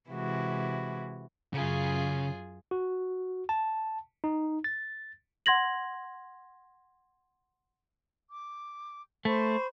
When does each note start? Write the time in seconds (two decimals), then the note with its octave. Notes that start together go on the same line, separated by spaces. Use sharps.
0.10 C3 E3 G#3 E4 F#4
1.53 F#2 C#3 F4 G#4
2.71 F#4
3.49 A5
4.24 D#4
4.64 A6
5.46 F#5 C6 G#6 A#6 F#7
8.29 D6
9.25 A3 C5 B5 C#6